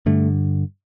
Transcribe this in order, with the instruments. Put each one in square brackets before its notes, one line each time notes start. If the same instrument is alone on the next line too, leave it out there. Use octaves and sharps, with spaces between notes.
[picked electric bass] G2 D3 A3